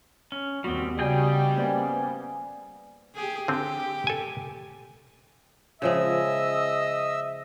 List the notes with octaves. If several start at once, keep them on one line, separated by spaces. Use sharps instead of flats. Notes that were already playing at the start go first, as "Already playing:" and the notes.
C#4
D#2 G3 B3 C4 F#4
C#3 G3 G#4 D#5 G5
A#3 B3 C#4 C5 D5
G4 G#4
D3 C4 G4
A4 G#5
C#3 F3 G#3 D#5 E5 E6